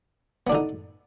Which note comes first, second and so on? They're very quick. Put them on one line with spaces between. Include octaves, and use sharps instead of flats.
B3 D4 D3 D#4